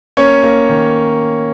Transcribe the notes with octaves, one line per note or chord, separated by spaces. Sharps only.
A#3 C#4 C#5
A#3
D#3